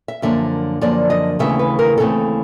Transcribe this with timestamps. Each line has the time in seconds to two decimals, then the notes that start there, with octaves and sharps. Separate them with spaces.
0.08 E5
0.22 F#2 D3 F3 A#3 E5
0.81 F#2 D3 F3 A#3 D5
1.10 D#5
1.39 D#2 C#3 E3 A3 C4 E5
1.59 B4
1.79 A#4
1.97 D#2 C#3 E3 A3 C4 A4